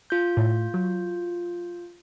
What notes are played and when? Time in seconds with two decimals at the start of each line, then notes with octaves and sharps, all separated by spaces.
0.10 F4 G6
0.37 A2
0.74 F#3